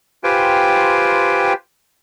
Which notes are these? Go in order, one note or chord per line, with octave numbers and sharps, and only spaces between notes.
F4 G4 B4 C5 G5 G#5